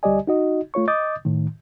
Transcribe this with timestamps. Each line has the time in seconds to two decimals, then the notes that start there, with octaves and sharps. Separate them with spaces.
0.03 D2 G3 G4 D5 D#5 G#5
0.27 D#4 F#4 D#5
0.74 A3 F4 C#5 C#6
0.88 D#5 D6 D#6 G6 A6
1.25 A2 D#3